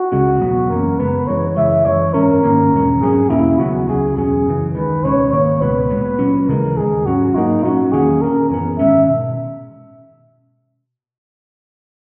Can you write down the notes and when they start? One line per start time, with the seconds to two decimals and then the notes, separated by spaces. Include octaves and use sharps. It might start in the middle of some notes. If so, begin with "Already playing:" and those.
Already playing: F#4
0.12 C#2 C#3 G#3 C#4
0.40 E2 B2 F#3 B3
0.70 F#2 E3 A#3 C#4 A#4
0.99 F#2 C#3 G#3 B3 B4
1.27 F#2 E3 G#3 C#5
1.56 F#2 C#3 E3 G#3 E5
1.85 F#2 E3 G#3 C#5
2.14 G#2 E3 G#3 C#4 A#4
2.43 G#2 D#3 A#3 C#4
2.72 E2 B2 G#3 C#4
3.01 G#2 F#3 A#3 C#4 G#4
3.30 E2 B2 A#3 C#4 E4
3.59 D#2 C#3 F#3 B3 F#4
3.88 C#2 C#3 F#3 G#4
4.17 E2 B2 F#3 C#4 G#4
4.46 F#2 C#3 E3
4.75 D#2 D#3 G#3 B4
5.03 C#2 B2 G#3 C#4 C#5
5.32 G#2 D#3 A#3 C#5
5.61 C#2 B2 G#3 B3 B4
5.90 A#2 G#3 B3
6.19 A#2 F#3 C#4
6.48 D#2 C#3 E3 G#3 A#4
6.77 D#2 C#3 G#3 G#4
7.06 G#2 F#3 C#4 F#4
7.35 G#2 F#3 A#3 D#4
7.63 A#2 F#3 C#4 F#4
7.92 E2 D#3 A#3 C#4 G#4
8.22 A#2 A#3 C#4 A#4
8.51 F#2 E3 B3
8.79 G#2 D#3 G#3 C#4 E5
9.09 B2